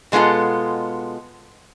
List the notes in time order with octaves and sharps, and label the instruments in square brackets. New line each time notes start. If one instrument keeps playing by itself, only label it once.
[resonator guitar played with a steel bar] B2 G#3 B3 F4 A4